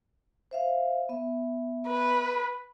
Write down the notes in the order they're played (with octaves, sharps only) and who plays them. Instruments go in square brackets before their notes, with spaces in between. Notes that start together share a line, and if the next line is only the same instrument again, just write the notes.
[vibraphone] C5 E5 F5
B3 E5
[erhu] B4